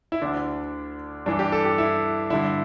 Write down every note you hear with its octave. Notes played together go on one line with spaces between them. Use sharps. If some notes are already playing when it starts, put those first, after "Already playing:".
E4
D2 D3 D4
G2 E3 D4
G4
A4
G4
E4
G2 D3 E4